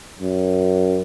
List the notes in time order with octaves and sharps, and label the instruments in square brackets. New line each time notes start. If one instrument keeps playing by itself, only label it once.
[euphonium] F#2